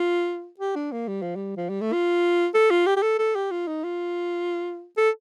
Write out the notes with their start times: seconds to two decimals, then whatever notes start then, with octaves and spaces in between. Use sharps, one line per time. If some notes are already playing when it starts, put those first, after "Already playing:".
Already playing: F4
0.60 G4
0.75 D4
0.92 A#3
1.08 G3
1.22 F3
1.36 G3
1.57 F3
1.69 G3
1.81 A3
1.93 F4
2.54 A4
2.70 F4
2.87 G4
2.97 G4
3.03 A4
3.19 A4
3.35 G4
3.51 F4
3.67 D#4
3.84 F4
4.97 A4